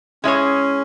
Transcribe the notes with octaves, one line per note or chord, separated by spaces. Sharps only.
G#3 C#4 E4 G#4 C#5